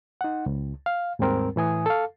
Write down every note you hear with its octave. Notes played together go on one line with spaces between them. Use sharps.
D#4 F#5
C#2
F5
D#2 G#2 G3 C4 A#4
A2 E3 G#5 D#6
A4 F5